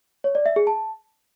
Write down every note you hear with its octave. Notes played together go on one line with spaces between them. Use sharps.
C#5
D5
E5
G#4
A5